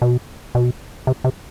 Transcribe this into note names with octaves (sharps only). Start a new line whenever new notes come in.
B2
B2
C3
C3